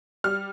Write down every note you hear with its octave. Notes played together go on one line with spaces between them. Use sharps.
G3 F6